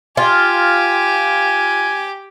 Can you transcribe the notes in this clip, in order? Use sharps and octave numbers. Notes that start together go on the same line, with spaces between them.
F4 G4 G#5